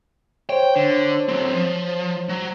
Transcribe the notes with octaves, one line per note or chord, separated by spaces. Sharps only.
C5 C#5 G5
D3
F#3 C4
F3
F#3